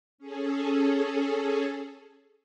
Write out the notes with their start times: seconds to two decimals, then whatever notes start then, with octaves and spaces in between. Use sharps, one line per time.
0.18 C#4 G#4 A4